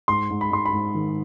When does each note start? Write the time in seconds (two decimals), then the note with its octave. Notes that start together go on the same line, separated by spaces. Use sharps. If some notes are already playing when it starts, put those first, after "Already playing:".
0.08 G#2 C6
0.30 G#2
0.41 B5
0.51 G#2 C6
0.66 B5
0.73 G#2
0.94 D#3